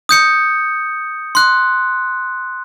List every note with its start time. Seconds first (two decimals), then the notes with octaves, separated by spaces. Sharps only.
0.09 D#6 G6 C#7
1.35 C6 F#6